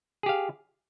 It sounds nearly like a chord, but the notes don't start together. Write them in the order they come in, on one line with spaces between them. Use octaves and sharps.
G#4 G4 F5